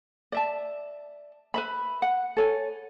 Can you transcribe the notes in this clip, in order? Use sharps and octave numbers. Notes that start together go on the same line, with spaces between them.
D5 E5 A5
B4 E5 B5
F#5
A4 C#5 G#5